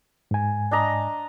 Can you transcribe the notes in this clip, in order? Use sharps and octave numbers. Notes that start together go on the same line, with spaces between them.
G#2 G#5
D4 D#5 A#5